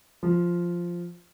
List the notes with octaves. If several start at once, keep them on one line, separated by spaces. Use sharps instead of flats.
F3